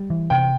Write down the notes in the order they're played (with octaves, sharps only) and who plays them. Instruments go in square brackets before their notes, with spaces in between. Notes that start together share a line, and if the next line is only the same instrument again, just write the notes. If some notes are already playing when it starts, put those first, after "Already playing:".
Already playing: [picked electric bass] G3
E3
[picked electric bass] C3 [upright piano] G5